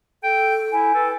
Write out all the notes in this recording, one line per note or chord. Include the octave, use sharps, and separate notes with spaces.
A4 G5
E4 G#5
A4 B4